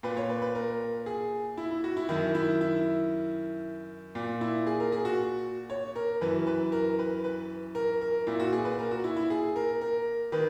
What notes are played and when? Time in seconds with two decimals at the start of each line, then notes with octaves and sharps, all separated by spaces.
0.03 A#2 B4
0.17 C#5
0.30 B4
0.42 B4
0.55 A#4
1.06 G#4
1.57 E4
1.71 E4
1.84 F#4
1.97 E4
2.09 F#2 D#3 E4
2.35 E4
2.61 E4
4.15 A#2
4.41 E4
4.67 G#4
4.80 A#4
4.92 G#4
5.05 F#4
5.70 C#5
5.96 A#4
6.21 F#2 E3 B4
6.47 B4
6.72 A#4
6.99 B4
7.24 B4
7.75 A#4
8.02 A#4
8.27 A#2 E4
8.40 F#4
8.53 G#4
8.65 B4
8.79 A#4
8.91 F#4
9.04 E4
9.16 E4
9.30 G#4
9.56 A#4
9.81 A#4
10.32 D#3 B4